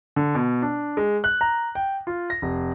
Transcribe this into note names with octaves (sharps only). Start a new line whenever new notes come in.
D3
B2
D4
G#3
F#6
A#5
G5
F4
A#6
F1